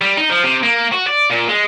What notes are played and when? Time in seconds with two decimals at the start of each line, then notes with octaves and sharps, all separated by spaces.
0.01 G3
0.17 D#4
0.30 F3
0.43 C3
0.63 A#3
0.92 F#4
1.07 D5
1.30 A#2
1.48 G#3